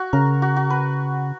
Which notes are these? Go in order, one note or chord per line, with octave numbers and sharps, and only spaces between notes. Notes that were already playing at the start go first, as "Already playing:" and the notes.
Already playing: F#4
C#3 A#4
F#4
F#4
B4